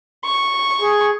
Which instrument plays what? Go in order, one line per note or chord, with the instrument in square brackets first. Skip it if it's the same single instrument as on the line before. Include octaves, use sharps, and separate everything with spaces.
[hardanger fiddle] C#6
[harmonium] G#4